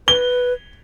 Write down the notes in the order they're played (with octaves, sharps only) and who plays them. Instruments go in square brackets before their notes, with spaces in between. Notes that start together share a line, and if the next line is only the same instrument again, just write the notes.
[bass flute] B4 [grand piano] G7